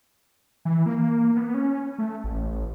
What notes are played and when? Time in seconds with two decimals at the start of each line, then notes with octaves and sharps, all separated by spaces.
0.65 E3
0.86 A#3
1.36 B3
1.54 C#4
1.98 A3
2.24 A1